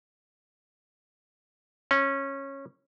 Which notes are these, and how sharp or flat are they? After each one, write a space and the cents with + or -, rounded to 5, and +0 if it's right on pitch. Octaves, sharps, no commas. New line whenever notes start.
C#4 -15